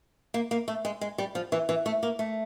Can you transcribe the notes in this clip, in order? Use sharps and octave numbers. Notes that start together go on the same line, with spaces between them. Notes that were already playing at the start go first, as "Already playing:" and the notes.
A#3
A#3
A3
G#3
G#3
G3
F3
E3
E3
A3
A#3
A3